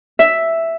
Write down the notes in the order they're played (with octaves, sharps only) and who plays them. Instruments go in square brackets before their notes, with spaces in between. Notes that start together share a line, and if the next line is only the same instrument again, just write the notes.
[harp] E5